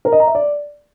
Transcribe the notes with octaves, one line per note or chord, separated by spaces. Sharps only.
A#4
D#5
A#5
E5
D5